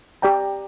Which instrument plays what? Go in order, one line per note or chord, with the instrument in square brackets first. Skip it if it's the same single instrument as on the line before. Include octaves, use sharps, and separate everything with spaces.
[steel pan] G4 D5 G5 A#5